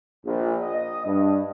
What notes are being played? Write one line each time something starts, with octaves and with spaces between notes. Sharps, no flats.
A#1
D#5
G2